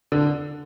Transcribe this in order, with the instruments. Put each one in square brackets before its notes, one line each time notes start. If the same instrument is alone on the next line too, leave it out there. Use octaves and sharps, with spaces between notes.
[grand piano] D3